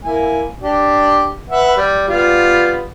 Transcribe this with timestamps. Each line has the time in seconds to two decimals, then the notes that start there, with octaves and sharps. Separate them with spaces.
0.04 A#3 E4 G#5
0.62 D4 G4
1.50 B4 E5 F#5
1.77 G3
2.08 G3 B3 F4